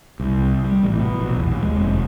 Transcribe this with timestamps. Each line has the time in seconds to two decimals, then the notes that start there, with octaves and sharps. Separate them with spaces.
0.20 C2
0.64 G3
0.83 A1
1.00 B2
1.21 A#1
1.37 E2
1.51 D#2
1.62 G#3
1.76 F1